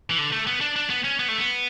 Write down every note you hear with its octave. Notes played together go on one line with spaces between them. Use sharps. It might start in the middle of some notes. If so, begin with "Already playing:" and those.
E3
D3
A3
B3
D4
D4
B3
C#4
B3
A3
B3